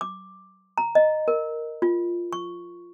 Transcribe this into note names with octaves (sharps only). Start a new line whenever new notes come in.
D6
A#5
D#5
A#4
F4
C#6